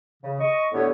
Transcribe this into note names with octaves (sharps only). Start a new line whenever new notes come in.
C#3
D#5 C#6
A2 D3 B3 G4 C#5